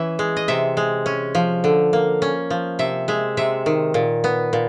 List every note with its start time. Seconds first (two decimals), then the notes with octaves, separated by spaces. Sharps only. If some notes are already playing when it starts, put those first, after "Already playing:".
Already playing: E3 C#4 E5
0.19 G#3
0.37 D#5
0.48 C3 E5
0.77 G#3
1.06 C#4
1.35 F3
1.64 D3
1.93 A#3
2.22 C#4
2.50 F3
2.79 C3 E5
3.08 G#3 E5
3.37 C3 E5
3.66 D#3
3.94 A#2
4.24 B3
4.53 A#2